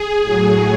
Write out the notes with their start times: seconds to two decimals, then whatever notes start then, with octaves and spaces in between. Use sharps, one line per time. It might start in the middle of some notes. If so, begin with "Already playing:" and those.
Already playing: G#4
0.20 A2 F#3